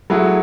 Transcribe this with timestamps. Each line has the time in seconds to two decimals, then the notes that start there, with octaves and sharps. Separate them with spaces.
0.10 F#3 A3 E4 G#4